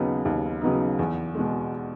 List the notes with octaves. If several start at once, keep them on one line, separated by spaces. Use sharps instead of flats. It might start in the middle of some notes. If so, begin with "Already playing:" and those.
Already playing: D#2 C#3 F#3 B3 D#4
D#2
C#3 F#3 B3 D#4
E2
B2 G#3